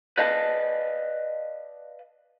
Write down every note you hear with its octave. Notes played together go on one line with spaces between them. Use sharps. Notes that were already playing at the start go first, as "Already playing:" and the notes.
B4 D5 D#5 F5 A5